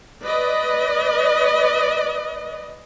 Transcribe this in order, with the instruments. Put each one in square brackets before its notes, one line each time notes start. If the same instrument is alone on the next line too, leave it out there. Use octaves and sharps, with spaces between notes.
[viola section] B4 D5 D#5